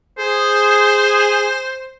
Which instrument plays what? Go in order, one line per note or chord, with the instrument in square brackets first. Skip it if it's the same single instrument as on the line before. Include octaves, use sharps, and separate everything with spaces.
[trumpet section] G#4 [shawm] C5